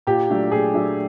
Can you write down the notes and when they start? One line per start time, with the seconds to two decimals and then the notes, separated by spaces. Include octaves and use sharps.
0.07 A#2 G4
0.30 F#3 A3 D4
0.51 A#2 G#4
0.74 F#3 A3 D4